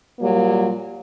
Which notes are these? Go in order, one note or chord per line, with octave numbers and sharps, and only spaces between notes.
A#2 F#3 G3 A#3